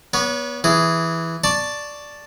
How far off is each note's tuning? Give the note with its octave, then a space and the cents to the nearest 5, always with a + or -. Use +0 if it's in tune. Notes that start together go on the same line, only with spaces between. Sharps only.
B3 -25 C#5 +30
E3 +0 G#4 +0
D5 +0 A5 +0 C#6 +0